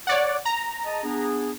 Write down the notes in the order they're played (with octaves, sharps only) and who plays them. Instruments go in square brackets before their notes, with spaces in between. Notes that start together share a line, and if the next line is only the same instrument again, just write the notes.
[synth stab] C#5 D5 F#5
A#5
[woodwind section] G#4 D#5 A5
B3 D4 G#4